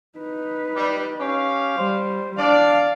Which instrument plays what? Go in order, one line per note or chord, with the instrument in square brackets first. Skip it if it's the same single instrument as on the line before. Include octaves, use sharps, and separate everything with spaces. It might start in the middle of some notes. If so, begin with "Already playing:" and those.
[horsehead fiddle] D#4 B4
[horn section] G3
[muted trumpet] C#4 [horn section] G4 F5
[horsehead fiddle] G3 [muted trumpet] C5
[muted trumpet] D4 [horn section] D5 [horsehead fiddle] F5